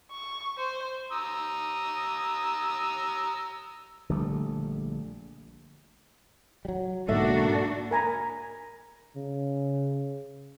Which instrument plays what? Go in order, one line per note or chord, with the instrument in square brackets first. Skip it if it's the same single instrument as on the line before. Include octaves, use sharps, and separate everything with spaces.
[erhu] C#6
C5
[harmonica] A#5 D#6 E6
[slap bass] A#1 D3 G3 A3
[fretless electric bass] F#3 G3
[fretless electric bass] B1 G#2 D3 [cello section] A#3 D4 F#4 [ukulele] A4 E5
[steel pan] A#4 G#5 A#5 B5
[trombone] C#3